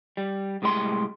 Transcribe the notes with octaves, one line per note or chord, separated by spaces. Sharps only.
G3
C2 A2 G#3 G4 B4 C6